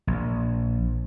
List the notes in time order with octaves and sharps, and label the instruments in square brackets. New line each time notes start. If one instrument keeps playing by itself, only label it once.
[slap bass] A#1